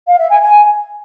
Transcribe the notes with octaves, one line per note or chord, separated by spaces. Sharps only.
F5
E5
G#5
G#5